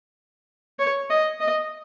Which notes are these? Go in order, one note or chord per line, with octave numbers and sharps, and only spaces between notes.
C#5
D#5
D#5